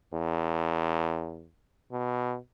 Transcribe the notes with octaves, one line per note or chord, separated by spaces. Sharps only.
E2
B2